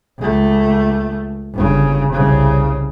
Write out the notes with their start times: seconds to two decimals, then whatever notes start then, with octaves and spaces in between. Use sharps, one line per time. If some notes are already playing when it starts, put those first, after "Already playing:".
0.18 C#2 A3
1.53 G1 C#3
2.13 C2 C#3